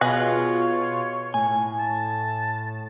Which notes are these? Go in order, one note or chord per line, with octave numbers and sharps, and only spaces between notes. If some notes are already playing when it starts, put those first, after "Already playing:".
B2 F4 G#4 B4 C#5 D#5
A2 G#5
A5